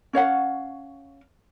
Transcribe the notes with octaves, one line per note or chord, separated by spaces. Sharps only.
C#4 C#5 F5 F#5